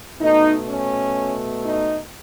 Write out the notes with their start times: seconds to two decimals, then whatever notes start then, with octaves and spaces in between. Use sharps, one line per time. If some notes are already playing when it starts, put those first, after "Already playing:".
0.20 B2 A3 D#4
0.69 C#4
1.65 D#4